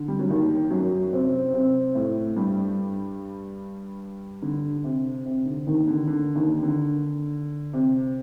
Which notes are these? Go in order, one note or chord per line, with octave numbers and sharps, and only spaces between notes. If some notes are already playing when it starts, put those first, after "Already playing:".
Already playing: D3
G3
F#3
D#2 D#3
F#2 F#3
C3 C4
C3 C4
A2 A3
G2 G3
D3
C3
C3
D3
D#2 D#3
D3
D3
D#2 D#3
D3
C3